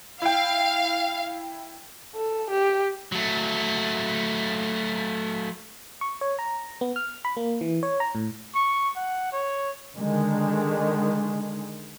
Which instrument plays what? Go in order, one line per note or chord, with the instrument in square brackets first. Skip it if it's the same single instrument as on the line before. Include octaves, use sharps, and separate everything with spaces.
[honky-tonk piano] E4 G5 [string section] F5
[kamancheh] A4
G4
[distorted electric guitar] F#3 A3
[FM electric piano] C#6
C#5
A#5
B3
F6
B5
A#3
E3
C#5
A#5
A2
[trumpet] C#6
F#5
C#5
[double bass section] D3 D#3 G#3